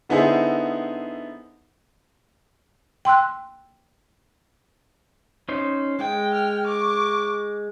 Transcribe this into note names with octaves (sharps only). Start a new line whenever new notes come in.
D3 B3 D#4 E4 G#4 C5
G5 C6 E6 F#6
C#4 D#4 C5
G#3 G5
G5 F6
C#6 D6